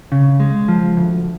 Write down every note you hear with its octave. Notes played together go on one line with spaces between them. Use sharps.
C#3
G#3
F3
D2